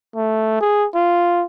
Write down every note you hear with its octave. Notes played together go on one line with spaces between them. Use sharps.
A3
G#4
F4